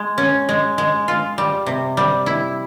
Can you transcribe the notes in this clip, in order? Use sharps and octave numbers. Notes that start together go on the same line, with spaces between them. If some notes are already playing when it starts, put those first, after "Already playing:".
Already playing: G#3
C#4
G#3
G#3
F4
G3
C3
G3
E4